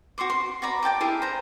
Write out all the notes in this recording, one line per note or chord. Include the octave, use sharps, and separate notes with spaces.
F#4 C5 C6 D6
C6
F#4 D5 A#5 B5
D5 G5 A5 D6
E4 G4 G#4 A#4
C5 A#5